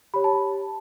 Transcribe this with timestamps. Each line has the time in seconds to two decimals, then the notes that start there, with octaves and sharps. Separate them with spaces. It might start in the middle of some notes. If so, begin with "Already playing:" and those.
0.14 G4 C#5 B5
0.24 A5